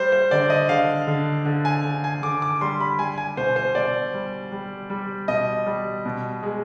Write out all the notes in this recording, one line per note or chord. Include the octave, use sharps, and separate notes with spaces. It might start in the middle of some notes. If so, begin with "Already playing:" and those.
Already playing: G3 C5
C5
D3 D5
D#5
D3 F5
D3
D3
G#5
D3
G#5
D3 D6
D6
G3 C6
B5
G3 G#5
G#5
B2 C5
C5
B2 D5
G3
G3
G3
B2 D#5
G3
B2
G#3